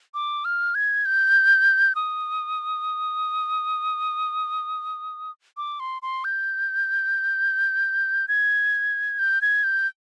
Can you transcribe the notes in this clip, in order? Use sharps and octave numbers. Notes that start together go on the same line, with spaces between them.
D6
F6
G#6
G6
D#6
D6
C6
C6
G6
G#6
G6
G#6
G6